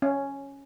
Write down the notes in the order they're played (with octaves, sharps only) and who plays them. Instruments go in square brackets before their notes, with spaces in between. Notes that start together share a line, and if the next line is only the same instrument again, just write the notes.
[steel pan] C#4